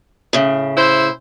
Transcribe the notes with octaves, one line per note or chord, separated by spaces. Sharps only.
A2 C#3
E4 C5